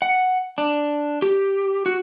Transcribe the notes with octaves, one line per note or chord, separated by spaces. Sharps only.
F#5
D4
G4
F#4